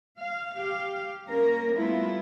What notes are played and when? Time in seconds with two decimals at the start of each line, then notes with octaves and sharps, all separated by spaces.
0.19 F5
0.55 G4 F5
1.29 A#3 C#4 A#4
1.76 G3 A3 B3 E4 F4